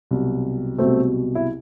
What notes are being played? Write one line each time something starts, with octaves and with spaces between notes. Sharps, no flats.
C2 B2 F#3
C2 B2 F#3 A3 C4
E4